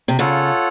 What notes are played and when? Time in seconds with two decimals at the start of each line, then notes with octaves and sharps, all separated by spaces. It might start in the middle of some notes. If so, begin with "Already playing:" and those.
0.08 C3
0.19 C#3 F4 A4 C#5 F#5